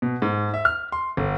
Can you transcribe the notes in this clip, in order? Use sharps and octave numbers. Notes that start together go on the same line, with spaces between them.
B2
G#2
E5
F6
C6
G1